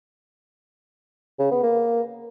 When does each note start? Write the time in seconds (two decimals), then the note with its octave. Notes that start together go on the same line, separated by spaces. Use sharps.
1.39 C#3
1.51 B3
1.63 A#3